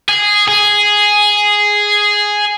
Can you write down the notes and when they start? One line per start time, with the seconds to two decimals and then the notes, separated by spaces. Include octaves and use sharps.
0.09 G#4
0.48 G#4